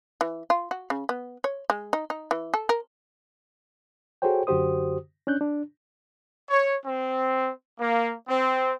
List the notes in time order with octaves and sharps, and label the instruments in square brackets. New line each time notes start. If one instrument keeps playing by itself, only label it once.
[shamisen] E3
F4
F#4
C#3
B3
C#5
G#3
D#4
D#4
E3
A4
A#4
[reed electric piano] F#4 G#4 A4 C5 C#5 G5
F#2 D3 F#4 G4 C5 D#6
C#4 D4 F#6 G6
D4
[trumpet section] C#5
C4
A#3
C4